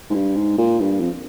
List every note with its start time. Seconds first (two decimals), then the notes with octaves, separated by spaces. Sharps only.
0.10 G#2
0.14 G2
0.36 G#2
0.58 A#2
0.80 G2
1.01 F2